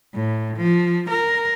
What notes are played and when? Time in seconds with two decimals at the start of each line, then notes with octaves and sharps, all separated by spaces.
0.14 A2
0.57 F3
1.10 A#4